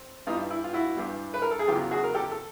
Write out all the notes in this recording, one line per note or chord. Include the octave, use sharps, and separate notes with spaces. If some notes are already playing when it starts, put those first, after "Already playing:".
Already playing: C4
G2 E3 G3 D#4 F4
E4
F4
E4 F#4
G2 E3 G3
B4
A#4
A4
G#4
E2 C#3 F#3 B3 F4 G4
F#4 G#4
A#4
G4 A4
A4